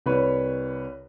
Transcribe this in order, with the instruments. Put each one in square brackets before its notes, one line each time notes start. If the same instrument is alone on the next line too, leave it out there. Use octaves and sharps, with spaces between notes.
[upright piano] C2 B4 C#5